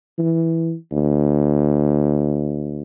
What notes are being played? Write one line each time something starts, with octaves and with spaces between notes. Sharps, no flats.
E3
D2